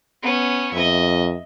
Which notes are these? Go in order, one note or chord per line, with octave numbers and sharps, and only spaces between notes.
B3 C#4
F2 D#5 E5